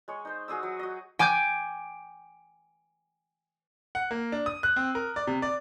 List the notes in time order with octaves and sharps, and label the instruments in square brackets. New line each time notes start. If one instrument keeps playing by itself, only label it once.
[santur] G#3 C#5
D#4 C5
F#4 G#4 D#6 E6
F#3
F#4 D#5
[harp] G5 G#5 D6 G6 G#6
[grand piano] F#5
A#3
D4
D#6
F#6
C4
A#4
D5
C3
D5